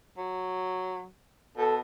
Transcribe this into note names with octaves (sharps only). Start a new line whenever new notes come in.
F#3
B2 A4